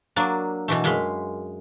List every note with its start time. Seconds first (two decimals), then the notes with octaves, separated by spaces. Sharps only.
0.16 F#3 A#3 D4
0.68 B2 E3 A3
0.84 F#2 G#3 F5 B5 C6